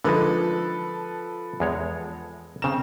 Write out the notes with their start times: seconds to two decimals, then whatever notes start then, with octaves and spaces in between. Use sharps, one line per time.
0.04 D3 F3 G#3 D#4 A4 B4
1.60 E2 G#3 C#5
2.62 C#3 C4 A#5 E7